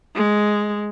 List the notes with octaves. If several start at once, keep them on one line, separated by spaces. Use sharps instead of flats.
G#3